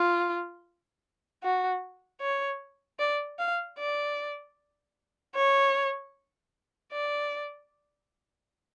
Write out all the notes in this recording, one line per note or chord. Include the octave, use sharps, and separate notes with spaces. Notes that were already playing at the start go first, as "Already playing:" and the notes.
Already playing: F4
F#4
C#5
D5
F5
D5
C#5
D5